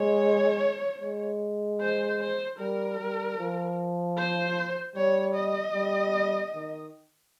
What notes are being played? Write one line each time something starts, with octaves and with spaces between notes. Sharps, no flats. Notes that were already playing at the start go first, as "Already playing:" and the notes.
Already playing: G#3 C#5
G#3
C5
C5
G3 A#4
G3
F3
C5
G3 C#5
D#5
G3
D#3